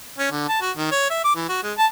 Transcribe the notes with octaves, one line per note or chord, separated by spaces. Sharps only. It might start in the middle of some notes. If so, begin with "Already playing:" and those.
C#4
D3
A5
F#4
D#3
C#5
E5
D6
E3
F#4
G#3
A5